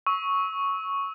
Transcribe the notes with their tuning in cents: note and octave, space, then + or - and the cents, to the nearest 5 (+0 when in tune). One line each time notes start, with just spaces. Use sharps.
C#6 +0 E6 -25